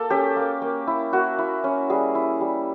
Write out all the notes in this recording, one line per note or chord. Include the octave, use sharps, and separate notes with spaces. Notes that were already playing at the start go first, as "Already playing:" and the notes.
Already playing: A#3 A4
C#4 G4
A#3
A#3
E4
A#3 F#4
E4
C#4
G3 G#4
E4
G3